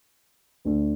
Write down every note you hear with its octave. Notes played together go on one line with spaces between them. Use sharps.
D2 D3 A3 D4